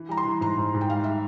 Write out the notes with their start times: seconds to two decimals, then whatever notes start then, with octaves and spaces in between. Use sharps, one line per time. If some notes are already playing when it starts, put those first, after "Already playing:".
Already playing: E3
0.09 G3 A#5
0.17 C6
0.25 E3
0.41 G#2 A#5
0.58 G#2
0.74 G#2
0.81 G5
0.90 G3 F5
1.04 E5